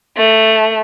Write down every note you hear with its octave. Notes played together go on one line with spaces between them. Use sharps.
A3